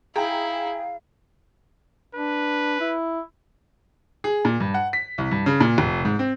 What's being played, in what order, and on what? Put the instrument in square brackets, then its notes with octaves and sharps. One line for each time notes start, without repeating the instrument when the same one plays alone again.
[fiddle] E4 [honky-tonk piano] G#4 G5 A#5 [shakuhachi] F5
[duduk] D4 [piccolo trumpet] B4
[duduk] E4
[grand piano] G#4
A#2
G2
F#5
B6
C2
G2
C#3
A#2
F1
G#2
C4